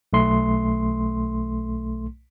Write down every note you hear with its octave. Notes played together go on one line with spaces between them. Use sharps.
B1 A3 C6